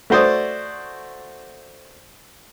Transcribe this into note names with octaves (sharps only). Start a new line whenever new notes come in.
A3 F#4 C5 D5 D#6